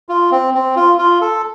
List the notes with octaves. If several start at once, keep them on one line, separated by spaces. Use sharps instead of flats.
F4
C4
C4
F4
F4
A4